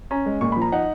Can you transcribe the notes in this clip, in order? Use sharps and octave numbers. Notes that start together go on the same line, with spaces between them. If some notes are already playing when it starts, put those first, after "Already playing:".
C#4 A#5
G#3
A#2 C#6
F3 B5
A#5
D#4 F#5